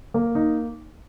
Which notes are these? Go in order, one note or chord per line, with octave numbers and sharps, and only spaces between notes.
A#3
D#4